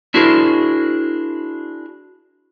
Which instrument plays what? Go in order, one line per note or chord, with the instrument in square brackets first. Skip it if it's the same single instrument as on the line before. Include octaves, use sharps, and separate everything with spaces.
[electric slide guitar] D4 E4 F#4 G#4 A#4 C5